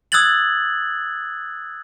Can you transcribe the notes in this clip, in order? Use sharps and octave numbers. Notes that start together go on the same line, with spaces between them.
D#6 E6 F#6 G#6 A6 F#7